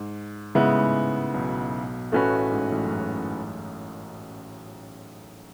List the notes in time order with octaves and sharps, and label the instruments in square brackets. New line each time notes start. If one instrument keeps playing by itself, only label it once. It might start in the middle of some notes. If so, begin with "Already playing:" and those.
Already playing: [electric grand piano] G#2
[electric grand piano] G#2 [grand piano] C#3 G#3 B3 E4
[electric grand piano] A2
G#2
B1 B2
[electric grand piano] A1 A2 [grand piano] A3 C#4 F#4 B4
[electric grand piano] G#2
A1 A2
F#2
G#2